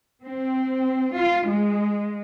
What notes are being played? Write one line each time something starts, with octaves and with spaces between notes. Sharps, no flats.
C4
F4
G#3